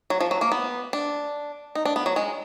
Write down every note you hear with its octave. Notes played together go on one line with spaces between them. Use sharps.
F#3
F3
F#3
A#3
B3
D4
D#4
D4
B3
F#3
G#3